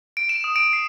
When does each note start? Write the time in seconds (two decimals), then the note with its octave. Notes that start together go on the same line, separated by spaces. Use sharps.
0.17 D7
0.29 E7
0.44 D#6
0.56 D7
0.73 C7